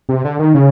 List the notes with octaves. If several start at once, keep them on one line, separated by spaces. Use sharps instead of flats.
C3
D3
D#3
C#3